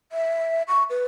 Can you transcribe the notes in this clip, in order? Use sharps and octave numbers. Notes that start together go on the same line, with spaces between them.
E5
C#6
B4